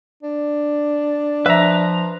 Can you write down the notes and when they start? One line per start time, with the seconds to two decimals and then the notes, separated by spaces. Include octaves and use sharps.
0.23 D4
1.46 F3 B4 E5 A#5